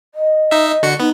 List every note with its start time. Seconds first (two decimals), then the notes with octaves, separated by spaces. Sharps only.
0.15 D#5
0.51 D#4 E5
0.83 D3 F#4 C#7
1.00 B3 D#4